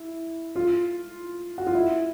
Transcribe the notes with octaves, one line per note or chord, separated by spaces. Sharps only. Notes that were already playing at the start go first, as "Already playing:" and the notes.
Already playing: E4
F4
F#4
F4
E4